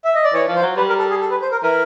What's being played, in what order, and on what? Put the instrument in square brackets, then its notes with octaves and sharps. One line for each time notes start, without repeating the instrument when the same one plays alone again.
[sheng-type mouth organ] E5
D#5
D5
[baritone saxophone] E3 [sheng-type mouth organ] C#5
[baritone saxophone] F3
[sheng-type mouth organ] C5
[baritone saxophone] F#3
[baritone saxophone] G3 [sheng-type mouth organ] B4
[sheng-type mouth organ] A#4
A4
G#4
A4
B4
C5
A#4
[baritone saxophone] E3 [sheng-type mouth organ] A#4